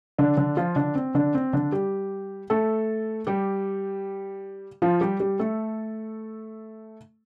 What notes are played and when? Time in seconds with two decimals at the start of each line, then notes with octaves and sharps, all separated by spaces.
0.18 D3 D4
0.37 D3 D4
0.57 F3 F4
0.76 D3 D4
0.95 C4
1.15 D3 D4
1.35 C4
1.53 D3 D4
1.72 G3 G4
2.50 A3 A4
3.27 G3 G4
4.82 F3 F4
5.01 G3 G4
5.20 G3 G4
5.39 A3 A4